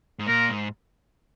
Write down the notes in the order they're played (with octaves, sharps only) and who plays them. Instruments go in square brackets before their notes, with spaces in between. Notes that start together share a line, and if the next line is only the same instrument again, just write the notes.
[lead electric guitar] G#2
[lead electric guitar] A#2 [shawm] A#4
[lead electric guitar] G#2